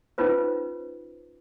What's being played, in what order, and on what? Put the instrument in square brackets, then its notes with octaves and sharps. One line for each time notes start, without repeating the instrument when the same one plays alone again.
[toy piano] C#4 D#4 F4 B4 C5